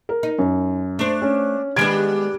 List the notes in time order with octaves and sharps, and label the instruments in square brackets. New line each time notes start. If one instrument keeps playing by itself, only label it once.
[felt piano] A#4
[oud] D#4
[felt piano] F#2
[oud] A3 C5 [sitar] D4
[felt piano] C#4
[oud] D#3 G#3 B3 [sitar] G3 D4 [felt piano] G#6 D7